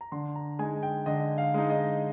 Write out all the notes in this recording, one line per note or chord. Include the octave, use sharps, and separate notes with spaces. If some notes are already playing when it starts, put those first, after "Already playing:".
A#5
D3 C6
A#5
G#3 D#4 G#5
G5
D3 D#5
F5
G#3 D#4
D#5